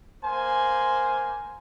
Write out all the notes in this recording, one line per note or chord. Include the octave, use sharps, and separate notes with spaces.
A#3 C5 G#5